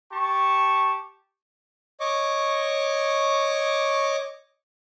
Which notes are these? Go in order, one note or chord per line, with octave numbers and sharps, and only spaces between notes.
G4 A5 C#6
C#5 D#5 C#6 D6